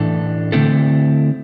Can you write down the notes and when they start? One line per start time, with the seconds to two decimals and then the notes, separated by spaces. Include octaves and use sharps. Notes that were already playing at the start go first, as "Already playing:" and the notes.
Already playing: A2 E3 A3 D4 A4
0.52 D3 A3 C4 E4 A4